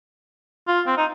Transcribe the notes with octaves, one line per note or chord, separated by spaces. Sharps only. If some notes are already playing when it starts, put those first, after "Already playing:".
F4
C4
D#4